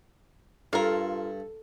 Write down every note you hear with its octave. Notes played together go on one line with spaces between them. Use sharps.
G2 F4 A4 A#4 F5